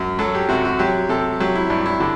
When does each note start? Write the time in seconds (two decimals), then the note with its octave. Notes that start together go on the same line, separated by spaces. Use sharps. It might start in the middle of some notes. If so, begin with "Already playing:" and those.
Already playing: F#2
0.19 F#3 A4
0.35 G4
0.49 C3 F#4
0.65 F#4
0.79 F#3 G4
1.09 C3 A4
1.40 F#3 G4
1.55 E4
1.70 G2 E4
1.86 E4
2.00 D3